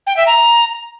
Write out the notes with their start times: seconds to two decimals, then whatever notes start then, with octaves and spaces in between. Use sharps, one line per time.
0.06 G5
0.16 E5
0.26 A#5